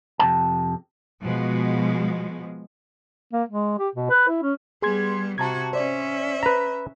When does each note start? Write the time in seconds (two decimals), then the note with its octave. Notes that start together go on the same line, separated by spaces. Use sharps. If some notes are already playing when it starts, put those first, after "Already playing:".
0.19 F2 C3 C4 G5 A5
1.22 B2 F3 G#3
3.33 A#3
3.49 G#3
3.79 G4
3.95 B2
4.10 B4
4.28 E4
4.42 C#4
4.82 G3 B3 G#4 C6 G#6
5.38 C3 F#4 A5 A#5 G#6
5.73 C#4 C5 D5 E5
6.43 B4 A#5